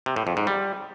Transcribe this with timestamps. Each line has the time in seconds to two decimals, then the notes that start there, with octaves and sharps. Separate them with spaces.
0.06 C3
0.16 A2
0.27 F2
0.37 G#2
0.47 G3